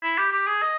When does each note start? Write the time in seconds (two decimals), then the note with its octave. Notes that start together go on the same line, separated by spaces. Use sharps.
0.03 E4
0.18 G4
0.32 G4
0.47 G#4
0.62 D#5